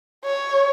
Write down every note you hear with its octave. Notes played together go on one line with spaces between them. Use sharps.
C#5